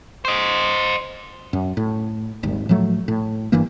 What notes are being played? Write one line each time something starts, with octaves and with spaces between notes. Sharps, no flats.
C5 D#5
F#2
A2
D#1 G#1 D#2
A2 F3 F#3 A3
A2
G1 G2 E3 A#3